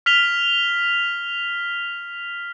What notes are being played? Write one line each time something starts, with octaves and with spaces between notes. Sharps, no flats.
F6 B6 F7 G7